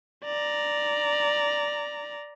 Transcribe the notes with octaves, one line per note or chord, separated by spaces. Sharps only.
D5 A#5